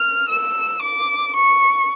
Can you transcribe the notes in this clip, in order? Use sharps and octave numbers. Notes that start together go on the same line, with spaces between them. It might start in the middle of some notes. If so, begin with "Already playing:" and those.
Already playing: F6
E6
D6
C#6